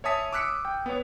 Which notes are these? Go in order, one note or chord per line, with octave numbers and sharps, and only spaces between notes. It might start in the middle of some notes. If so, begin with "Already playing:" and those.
C#5 E5 G#5 A5 D#6 B6
D6 E6 F#6 B6 C#7
G5
B3 B4 C#5